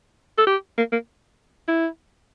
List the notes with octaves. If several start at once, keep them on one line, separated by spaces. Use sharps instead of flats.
A4
G4
A#3
A#3
E4